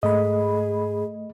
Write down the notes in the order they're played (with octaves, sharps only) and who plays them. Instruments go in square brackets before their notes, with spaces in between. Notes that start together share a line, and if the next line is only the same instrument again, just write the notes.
[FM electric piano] G#2 B5 [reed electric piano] A3 D#5 [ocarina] G#4